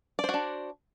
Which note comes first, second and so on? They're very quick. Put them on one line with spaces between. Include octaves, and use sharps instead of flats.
D5 C5 F#4 D4